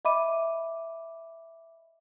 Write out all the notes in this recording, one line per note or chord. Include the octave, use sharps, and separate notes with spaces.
D#5 E5 B5 D6 D#7